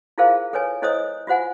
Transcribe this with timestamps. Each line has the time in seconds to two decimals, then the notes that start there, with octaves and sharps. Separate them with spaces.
0.18 E4 F4 G#4 A#4 C5 F5
0.53 A4 B4 C#5 G#5
0.82 E4 A4 C5 C#5 D#5 D#6
1.27 F4 F#4 C5 F#5 G#5